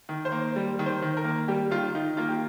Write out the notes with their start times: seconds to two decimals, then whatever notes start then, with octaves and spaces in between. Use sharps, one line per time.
0.09 D#3
0.25 C5
0.32 A#3
0.56 G3
0.79 D#3
0.86 C5
1.02 D#3
1.17 A#4
1.24 A#3
1.48 G3 G4
1.71 D#3 F4
1.95 D#3 D#4
2.17 A#3 F4
2.28 G4